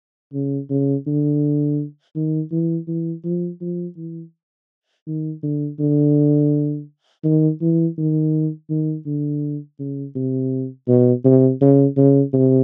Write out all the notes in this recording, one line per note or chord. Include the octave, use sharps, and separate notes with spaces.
C#3
C#3
D3
D#3
E3
E3
F3
F3
E3
D#3
D3
D3
D#3
E3
D#3
D#3
D3
C#3
C3
B2
C3
C#3
C#3
C3